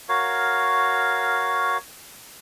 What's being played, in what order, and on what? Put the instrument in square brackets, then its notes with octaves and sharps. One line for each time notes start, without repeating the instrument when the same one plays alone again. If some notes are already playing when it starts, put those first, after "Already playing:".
[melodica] F#4 A#4 C#5 F5